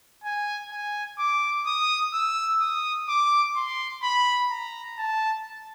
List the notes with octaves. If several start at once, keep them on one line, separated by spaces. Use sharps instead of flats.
G#5
G#5
D6
D#6
E6
D#6
D6
C6
B5
A#5
A5